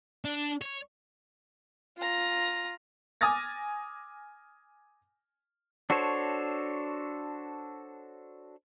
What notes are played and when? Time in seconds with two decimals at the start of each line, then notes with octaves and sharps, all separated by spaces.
0.25 D4
0.61 C#5
1.97 F4 A#5
3.21 G#5 D6 D#6 F6 A6 A#6
5.90 D4 F#4 A4 C5 C#5